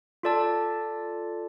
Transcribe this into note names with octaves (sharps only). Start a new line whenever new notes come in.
F4 A4 D5 A5